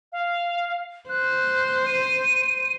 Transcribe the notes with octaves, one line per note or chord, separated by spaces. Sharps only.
F5
C5 F#6
D#7